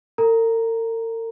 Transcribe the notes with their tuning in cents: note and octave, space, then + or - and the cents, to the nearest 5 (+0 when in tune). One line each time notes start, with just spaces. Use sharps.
A#4 -45 A#5 +0